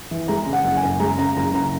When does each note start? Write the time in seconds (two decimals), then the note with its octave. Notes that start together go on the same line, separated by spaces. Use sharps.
0.11 E3
0.28 G#3 A#5
0.46 C#3
0.53 F#5
0.64 F#1
0.77 G#5
0.83 F#2
1.00 G#3 A#5
1.18 C#3 A#5
1.37 F#1 A#5
1.54 F#2 A#5